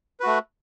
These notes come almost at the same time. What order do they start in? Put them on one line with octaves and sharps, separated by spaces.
B4 F#4 A3